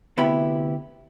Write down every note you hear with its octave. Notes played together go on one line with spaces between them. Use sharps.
D2 C3 B3 E4 G4 B5